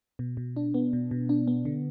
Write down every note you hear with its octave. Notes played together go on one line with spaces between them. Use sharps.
B2
B2
D4
B3
B2
B2
D4
B3
D3